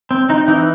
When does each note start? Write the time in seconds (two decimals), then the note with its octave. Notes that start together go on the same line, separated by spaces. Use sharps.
0.11 C4
0.29 C4 D#4
0.48 E3 D#4